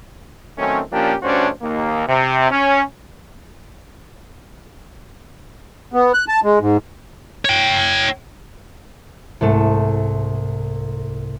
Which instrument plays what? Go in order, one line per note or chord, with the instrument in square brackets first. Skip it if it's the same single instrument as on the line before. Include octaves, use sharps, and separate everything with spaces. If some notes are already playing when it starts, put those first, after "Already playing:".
[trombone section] D#3 F#3 A3 C4 C#4
A#2 F3 A#3 C#4 D4 G4
D2 G2 C#4 D4 F#4 C5
D#2 A#3
C3
C#4
[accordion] B3
F#6
A5
G#3
G#2
[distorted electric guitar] C#5 G5
[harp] C2 G#2 A3 E7